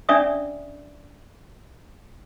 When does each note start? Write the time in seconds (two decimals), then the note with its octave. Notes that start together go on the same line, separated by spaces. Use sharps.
0.09 C#4 D4 D5 E5 D6 D#6